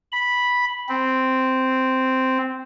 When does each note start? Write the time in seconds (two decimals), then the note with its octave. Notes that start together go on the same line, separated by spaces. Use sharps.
0.12 B5
0.89 C4